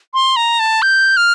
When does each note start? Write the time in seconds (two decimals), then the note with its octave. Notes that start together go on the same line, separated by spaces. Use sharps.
0.14 C6
0.36 A#5
0.60 A5
0.82 G6
1.17 F6